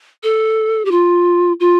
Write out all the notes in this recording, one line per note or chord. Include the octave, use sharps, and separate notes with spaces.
A4
G4
F4
F4